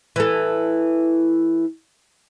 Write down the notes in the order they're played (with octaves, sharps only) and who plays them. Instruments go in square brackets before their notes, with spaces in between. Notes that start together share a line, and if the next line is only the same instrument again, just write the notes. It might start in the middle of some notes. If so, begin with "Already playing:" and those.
[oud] E3 A4